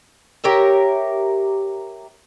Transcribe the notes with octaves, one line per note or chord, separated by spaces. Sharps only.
G4 A#4 C#5 E5